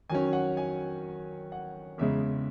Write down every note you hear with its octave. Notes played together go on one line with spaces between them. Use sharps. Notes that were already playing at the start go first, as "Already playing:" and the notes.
D#3 F#3 C#4 G#5
F#5
G#5
F#5
E2 C#3 G#3 E5